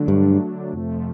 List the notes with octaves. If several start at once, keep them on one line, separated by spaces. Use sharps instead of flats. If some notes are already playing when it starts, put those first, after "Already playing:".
Already playing: D3 F#3 A3 D4
G2
F2 C3 F3 A3